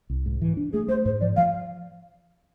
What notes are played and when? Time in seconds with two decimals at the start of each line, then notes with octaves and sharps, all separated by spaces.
0.10 C2
0.26 G#2
0.41 E3
0.57 D4
0.73 A3 G#4
0.89 A3 C5
1.05 G#2 C5
1.20 F3 D5
1.36 F3 F5